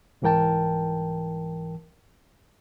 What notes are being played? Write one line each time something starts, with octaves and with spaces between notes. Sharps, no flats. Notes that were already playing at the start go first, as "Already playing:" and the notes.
C2 G#2 E3 A#4 G5 A5